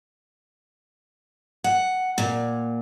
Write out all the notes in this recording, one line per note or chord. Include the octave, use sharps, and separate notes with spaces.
F#5
A#2